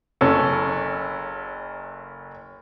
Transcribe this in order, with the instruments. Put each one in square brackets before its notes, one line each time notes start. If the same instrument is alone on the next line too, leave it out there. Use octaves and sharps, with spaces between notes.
[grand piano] F#1 C#4 A4